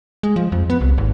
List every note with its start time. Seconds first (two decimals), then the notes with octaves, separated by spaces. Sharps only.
0.23 G#3
0.36 F3
0.52 F2
0.70 B3
0.81 C2
0.98 G#1